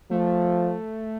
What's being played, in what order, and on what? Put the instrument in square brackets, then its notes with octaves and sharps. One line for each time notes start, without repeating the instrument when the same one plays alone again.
[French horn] F3 [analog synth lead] A3